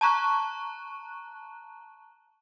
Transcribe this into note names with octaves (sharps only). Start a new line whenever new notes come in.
A5 A#5 C#6 F#6